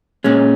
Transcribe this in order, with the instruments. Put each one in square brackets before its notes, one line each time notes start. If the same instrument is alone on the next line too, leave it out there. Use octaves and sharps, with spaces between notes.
[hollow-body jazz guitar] A#2 G#3 C#4